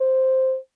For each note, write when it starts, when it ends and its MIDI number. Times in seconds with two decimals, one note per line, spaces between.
0.01 0.57 72